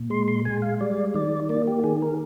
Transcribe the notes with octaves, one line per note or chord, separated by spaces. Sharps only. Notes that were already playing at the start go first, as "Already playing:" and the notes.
Already playing: A#2
G#3 C6
C6
G#3 G#5
F5
G3 D5
D#3 D5
A#3 D5
G4
D#3 G#4
A#4